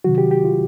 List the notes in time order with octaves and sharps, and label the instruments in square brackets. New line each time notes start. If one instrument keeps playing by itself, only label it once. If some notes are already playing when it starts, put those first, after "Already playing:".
[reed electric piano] C3 D#3 F#3 F#4
G4
G4
F4